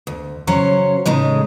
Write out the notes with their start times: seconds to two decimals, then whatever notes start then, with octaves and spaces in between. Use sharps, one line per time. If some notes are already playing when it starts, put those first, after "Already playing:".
0.07 D2
0.47 C#3 F#3 C#4 C5 C#5
1.06 A2 C#3 G#3 D#4